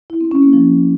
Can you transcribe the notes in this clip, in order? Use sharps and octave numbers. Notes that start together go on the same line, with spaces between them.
E4
C4
C#4
A#3
F3